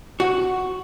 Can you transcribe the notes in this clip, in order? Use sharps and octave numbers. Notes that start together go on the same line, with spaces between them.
F#4